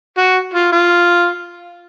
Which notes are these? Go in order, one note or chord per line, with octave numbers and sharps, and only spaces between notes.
F#4
F4
F4